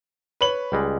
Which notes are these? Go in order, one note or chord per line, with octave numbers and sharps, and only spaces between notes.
B4 C#5 F#7
C#2 G3 G#3